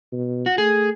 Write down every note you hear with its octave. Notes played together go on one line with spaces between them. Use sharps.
B2
F#4
A3 G#4